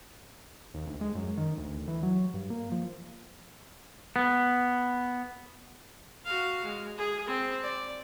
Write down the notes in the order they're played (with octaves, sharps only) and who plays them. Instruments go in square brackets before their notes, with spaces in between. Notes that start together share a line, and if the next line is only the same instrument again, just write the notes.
[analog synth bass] D#2
D2
G#3
F#2
D#3
D2
E3
F#3
G2
A#3
F3
[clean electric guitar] B3
[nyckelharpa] F#4 F5
G#3
G#4
C4
D5